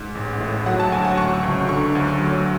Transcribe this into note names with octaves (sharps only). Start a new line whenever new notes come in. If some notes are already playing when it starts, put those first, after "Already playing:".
Already playing: G#2
A1
A2
F#3 F#5
A5
D2 G#5
F#5
F#3 C#6
C#2
D3 C#6
D2
F#3